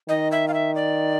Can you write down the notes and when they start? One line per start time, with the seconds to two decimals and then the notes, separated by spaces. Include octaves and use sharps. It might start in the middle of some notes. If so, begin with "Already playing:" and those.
0.09 D#3 D#5
0.32 E5
0.48 F5
0.54 E5
0.75 D5